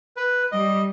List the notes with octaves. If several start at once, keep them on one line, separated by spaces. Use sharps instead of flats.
B4
G3 D#5